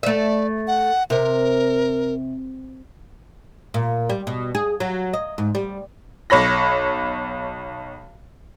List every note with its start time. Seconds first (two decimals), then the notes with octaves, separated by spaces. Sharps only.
0.03 A3 D5 E5
0.67 F#5
1.10 C3 A#4
3.74 A#2
4.10 G3
4.27 B2
4.55 G#4
4.80 F#3
5.13 D#5
5.38 G#2
5.55 G3
6.30 B1 C#5 B5 A#6